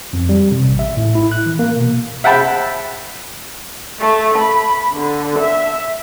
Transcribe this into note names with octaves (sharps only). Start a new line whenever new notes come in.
F2
G3
C3
A1
E5
A2
E4
F#6
E3
A#3
B2
E5 F#5 G5 A5 B5
A3
B5
D3
E5